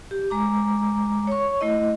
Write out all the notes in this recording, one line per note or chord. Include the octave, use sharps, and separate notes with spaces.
G4
G#3 A#5 D6
C#5 C#6
A3 E4 D#5